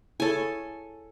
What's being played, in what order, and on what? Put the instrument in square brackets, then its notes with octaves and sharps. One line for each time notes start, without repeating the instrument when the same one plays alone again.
[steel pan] E4 G#4 C#5 [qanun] A4 G#5